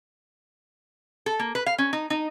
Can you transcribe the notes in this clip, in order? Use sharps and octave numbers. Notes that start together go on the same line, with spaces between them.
A4
A#3
B4
F5
C#4
D#4
D#4